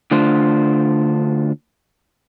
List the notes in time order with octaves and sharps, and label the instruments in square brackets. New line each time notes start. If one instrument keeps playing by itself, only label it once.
[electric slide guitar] D3 A3 D4 F4 C5